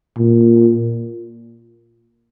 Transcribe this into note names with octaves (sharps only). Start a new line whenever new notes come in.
A#2